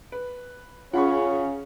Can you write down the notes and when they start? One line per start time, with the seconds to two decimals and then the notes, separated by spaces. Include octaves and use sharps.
0.12 B4
0.94 C#3 C#4 F4 G#4 F#5 B5 C#6